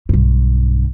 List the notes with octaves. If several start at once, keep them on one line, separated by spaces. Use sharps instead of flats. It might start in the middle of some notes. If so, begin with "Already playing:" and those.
B1 G2